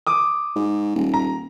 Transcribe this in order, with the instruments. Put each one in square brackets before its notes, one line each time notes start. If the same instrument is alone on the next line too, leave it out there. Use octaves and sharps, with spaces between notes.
[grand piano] D6 D#6
[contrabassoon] G#2
D#1
[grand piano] A#5